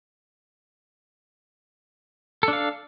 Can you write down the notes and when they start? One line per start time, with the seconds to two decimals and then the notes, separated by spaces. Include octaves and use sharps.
2.43 A4
2.48 D4
2.53 F5